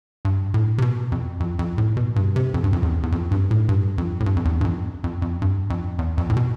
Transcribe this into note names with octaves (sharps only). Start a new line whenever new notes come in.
G2
A2
C3
B2
F2
F2
F2
A2
B2
G2
C3
F2
G2
F2
E2
E2
F2
G2
A2
G2
F2
A2
G2
F2
E2
G2
F2
F2
F2
G2
F2
E2
F2
A2
B2